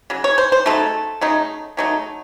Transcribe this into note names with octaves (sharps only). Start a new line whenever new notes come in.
C#3 F#3
C#5
C5
C5
C#3 F#3 A3 D#4 A4
C#3 F#3 A3 D#4
C#3 F#3 A3 D#4